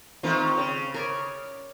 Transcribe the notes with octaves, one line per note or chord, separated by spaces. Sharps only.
D#3 A3 C4 F4
C#3
A#4 C#5 D5